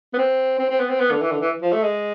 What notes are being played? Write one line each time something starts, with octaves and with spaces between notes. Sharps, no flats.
B3
C4
C4
C4
B3
C4
B3
D3
E3
D3
E3
F3
A3
G#3